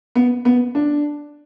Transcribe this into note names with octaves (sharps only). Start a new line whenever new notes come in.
B3
B3
D4